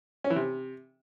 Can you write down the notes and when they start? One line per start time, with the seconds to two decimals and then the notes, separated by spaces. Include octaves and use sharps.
0.24 C#4
0.30 E3
0.36 C3